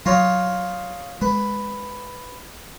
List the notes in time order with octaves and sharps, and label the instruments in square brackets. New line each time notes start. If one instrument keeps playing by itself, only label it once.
[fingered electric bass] F#3 [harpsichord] D#4 F4 C#5
[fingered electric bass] G#3 [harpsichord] B4